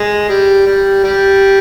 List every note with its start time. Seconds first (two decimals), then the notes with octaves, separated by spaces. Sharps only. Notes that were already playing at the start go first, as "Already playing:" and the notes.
Already playing: G#3
0.29 G3
0.66 G3
1.04 G3